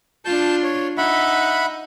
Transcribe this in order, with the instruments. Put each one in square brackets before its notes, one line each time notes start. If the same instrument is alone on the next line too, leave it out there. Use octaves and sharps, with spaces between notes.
[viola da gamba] D4 F4 [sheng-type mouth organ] A5 G6
[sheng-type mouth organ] C#5
[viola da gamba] D#4 [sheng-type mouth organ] E5 F#5 B5